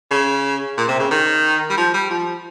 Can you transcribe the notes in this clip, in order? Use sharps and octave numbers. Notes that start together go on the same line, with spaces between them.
C#3
A#2
C3
C#3
D#3
G3
F3
G3
F3